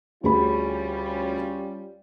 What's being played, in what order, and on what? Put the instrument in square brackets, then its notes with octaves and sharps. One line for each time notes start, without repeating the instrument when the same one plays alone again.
[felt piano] D2 G#4 B5 [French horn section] G3 C#4 F4